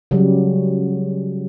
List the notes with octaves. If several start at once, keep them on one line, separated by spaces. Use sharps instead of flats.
C#3 F#3 G3